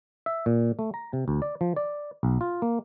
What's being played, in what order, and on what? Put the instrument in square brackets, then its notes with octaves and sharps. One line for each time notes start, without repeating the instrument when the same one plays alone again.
[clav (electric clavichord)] E5
A#2
A3
A#5
C3
D2
D5
F3
D5
B1
F4
A#3